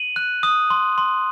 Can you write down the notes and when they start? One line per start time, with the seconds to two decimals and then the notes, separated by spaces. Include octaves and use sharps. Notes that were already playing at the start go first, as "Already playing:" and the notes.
Already playing: D#7 F#7
0.16 F#6
0.43 D#6
0.70 C6
0.98 C6